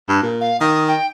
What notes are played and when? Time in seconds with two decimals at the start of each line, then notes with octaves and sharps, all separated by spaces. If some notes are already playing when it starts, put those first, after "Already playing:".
0.09 G2
0.22 A#2
0.41 F5
0.61 D#3 D#6
0.87 G5